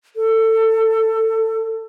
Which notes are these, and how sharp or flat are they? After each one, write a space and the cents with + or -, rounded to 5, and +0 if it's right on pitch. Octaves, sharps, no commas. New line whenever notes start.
A4 +20